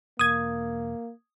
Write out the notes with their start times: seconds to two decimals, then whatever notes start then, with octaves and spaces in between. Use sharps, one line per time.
0.19 E1 A#3 D#6 G#6